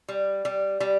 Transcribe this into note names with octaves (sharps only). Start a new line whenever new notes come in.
G3
G3
G3